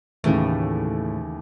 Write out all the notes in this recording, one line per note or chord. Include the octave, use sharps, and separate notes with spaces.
D#2 A2 C#3 E3 A3